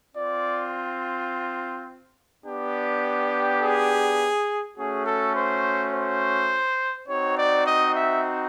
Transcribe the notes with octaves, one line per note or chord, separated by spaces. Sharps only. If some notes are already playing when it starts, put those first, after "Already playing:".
C4 F4 D5
B3 D4 G4
G#4
A3 C#4 F#4 G#4
A4
C5
C5
C4 D#4 F#4 C#5
D5
D#5
E5